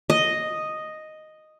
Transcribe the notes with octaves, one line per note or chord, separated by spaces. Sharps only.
D#5